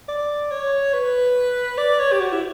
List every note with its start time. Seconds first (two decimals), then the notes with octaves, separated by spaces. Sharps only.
0.09 D5
0.51 C#5
0.94 B4
1.78 D5
2.00 C#5
2.12 G4
2.20 F#4
2.32 E4